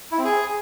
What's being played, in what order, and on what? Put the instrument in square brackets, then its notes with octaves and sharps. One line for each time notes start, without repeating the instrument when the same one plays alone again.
[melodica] E4
C4
G#4